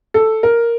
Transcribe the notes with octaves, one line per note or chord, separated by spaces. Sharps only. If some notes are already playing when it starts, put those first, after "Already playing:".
A4
A#4